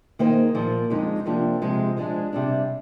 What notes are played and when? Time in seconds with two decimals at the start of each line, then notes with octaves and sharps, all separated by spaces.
0.19 D#3 A#3 D#4 G#4 C5
0.55 A#2 F3 A#3
0.90 F2 D3 G#3 D#4
1.26 F2 C3 F3 A#3 D4
1.61 C3 F3 G#3
1.97 F3 G#3 D4 G#4
2.32 C3 G3 D4